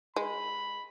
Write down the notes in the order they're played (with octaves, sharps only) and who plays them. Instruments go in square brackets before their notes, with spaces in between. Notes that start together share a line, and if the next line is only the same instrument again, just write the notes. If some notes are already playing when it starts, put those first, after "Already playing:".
[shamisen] G#3 [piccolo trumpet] B5